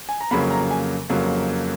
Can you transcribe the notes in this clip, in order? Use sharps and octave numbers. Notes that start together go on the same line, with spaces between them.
G#5
A#5
F2 C#3 F#3 A#3 B5
A#5
G#5
F2 C#3 F#3 A#3